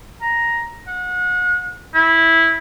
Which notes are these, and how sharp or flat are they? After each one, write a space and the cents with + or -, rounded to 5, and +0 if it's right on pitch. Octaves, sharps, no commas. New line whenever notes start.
A#5 +5
F#5 -35
E4 -10